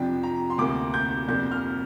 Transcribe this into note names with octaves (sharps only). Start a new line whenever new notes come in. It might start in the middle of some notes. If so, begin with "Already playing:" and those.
Already playing: F2 C3 F3 D4 G5
A#5
C6
D2 C3 A#3 D6
G6
F2 C3 A#3 D4 G6
F6